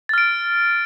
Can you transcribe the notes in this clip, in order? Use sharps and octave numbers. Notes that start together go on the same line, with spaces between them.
F6 A6 D7